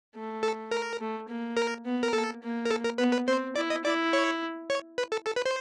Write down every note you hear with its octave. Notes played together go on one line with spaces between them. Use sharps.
A3
A4
A#4
A3
A#3
A#4
B3
A#4
A#3 A4
A#3
A#4
A4
A#4
B3 B4
B4
C4 C5
E4 D5
D#5
E4 D5
C#5
C#5
B4
A4
A4
B4
C5